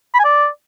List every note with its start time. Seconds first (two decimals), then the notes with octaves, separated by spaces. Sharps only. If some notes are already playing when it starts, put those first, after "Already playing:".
0.14 B5
0.19 G#5
0.24 D5